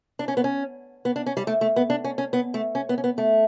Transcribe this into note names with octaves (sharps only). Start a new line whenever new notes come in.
D4
C#4
B3
C#4
B3
D4
C#4
G3
A3
A3
B3
D4
C#4
C#4
B3
A3
C#4
B3
C#4
B3
A3